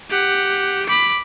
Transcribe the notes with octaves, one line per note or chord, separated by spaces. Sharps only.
G4 F#5
B5 D6